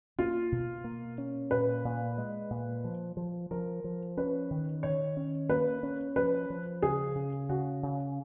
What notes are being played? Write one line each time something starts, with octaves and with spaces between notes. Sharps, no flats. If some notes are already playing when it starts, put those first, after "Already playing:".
A#3 F4
B2
A#3
C#4
A#2 B4
A#2
G#3
A#2
F3
F3
F3 A#4
F3
C#4 B4
D#3
D#3 C#5
C#4
A#3 B4
C#4
F3 B4
F3
C#3 G#4
C#3
C#3 F#4
C#3